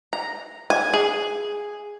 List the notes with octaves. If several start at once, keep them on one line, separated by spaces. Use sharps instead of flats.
A#5
G#5
G#4